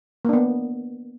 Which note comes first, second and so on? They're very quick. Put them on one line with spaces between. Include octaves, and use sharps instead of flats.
A#3 D4 B3